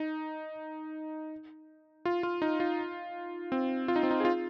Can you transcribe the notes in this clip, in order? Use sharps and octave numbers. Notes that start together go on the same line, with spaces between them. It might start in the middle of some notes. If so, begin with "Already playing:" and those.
Already playing: D#4
F4
F4
D#4
F4
C4
F4
D#4
C4
D#4
G#4
F4